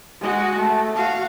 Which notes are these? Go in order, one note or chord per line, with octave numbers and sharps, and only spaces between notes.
G#3 F#4
A3
F#4 F5